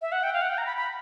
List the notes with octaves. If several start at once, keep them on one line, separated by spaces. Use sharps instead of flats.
E5
F#5
G5
F5
F#5
G5
A#5
B5
B5